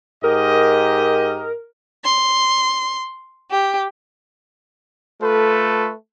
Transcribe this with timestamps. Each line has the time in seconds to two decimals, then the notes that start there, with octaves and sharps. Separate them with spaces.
0.24 G#2 G4 A#4 D#5
2.04 C6
3.50 G4
5.22 A3 F4 A4 B4